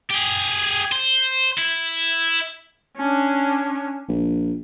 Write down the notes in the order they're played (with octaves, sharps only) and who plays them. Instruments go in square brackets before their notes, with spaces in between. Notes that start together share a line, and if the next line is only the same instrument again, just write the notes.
[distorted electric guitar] G4 G#4
C5
E4
[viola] C#4 D4
[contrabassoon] A#1